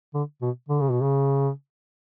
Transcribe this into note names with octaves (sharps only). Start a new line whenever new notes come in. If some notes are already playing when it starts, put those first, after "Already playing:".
D3
B2
D3
C#3
B2
C#3